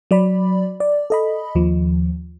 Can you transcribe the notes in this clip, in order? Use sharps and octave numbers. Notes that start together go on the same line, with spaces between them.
F#3 D5 B5
D5
A4 D#5 B5
D#2 F3